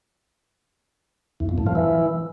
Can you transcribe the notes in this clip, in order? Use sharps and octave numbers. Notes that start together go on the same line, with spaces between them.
E2
F2
A2
F3
E3